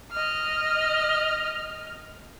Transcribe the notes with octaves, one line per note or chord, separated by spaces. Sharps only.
D#5 F6